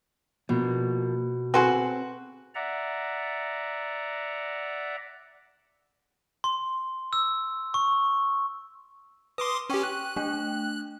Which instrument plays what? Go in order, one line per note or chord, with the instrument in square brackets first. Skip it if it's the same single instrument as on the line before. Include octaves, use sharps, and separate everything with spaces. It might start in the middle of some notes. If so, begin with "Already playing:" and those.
[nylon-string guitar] B2 [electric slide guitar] F3 A#3
[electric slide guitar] C4 [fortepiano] F#4 C6 [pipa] G#4 A4 B4
[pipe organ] D5 E5 F#5 A#5
[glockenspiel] C6
E6
C#6
[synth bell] B4 [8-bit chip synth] C6 D6 D#6
[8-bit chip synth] C#4 G4 [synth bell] G5 C#6 D#7
[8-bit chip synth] F#6
[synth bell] A3 D4 G5